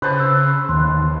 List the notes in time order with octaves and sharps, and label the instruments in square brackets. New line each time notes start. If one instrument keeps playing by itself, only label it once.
[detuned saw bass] C#3 [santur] B4 C5 A5
[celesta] E6
[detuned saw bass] D#2 [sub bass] D#3 [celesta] C6 F#6